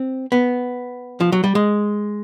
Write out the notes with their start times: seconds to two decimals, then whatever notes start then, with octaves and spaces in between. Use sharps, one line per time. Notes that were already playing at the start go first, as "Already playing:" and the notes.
Already playing: C4
0.32 B3
1.21 F3
1.32 F#3
1.44 G3
1.55 G#3